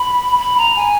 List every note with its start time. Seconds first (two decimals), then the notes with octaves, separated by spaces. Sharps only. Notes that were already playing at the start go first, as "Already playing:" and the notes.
Already playing: B5
0.38 B5
0.58 A#5
0.76 G#5